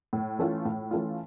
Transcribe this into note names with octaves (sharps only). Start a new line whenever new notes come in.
A2
E3 A3 C#4 F4
A2
E3 A3 C#4 F4